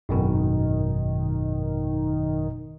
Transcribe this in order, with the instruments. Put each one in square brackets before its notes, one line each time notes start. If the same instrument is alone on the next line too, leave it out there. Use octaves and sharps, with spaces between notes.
[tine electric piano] G#1 F#2 B2 [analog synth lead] D#3